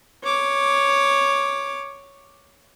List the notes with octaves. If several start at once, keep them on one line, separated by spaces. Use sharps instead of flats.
C#5 D6